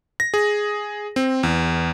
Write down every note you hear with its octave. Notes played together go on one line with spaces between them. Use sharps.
A#6
G#4
C4
E2